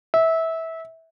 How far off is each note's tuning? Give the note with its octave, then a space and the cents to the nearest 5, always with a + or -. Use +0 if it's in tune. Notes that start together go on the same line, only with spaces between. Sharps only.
E5 -20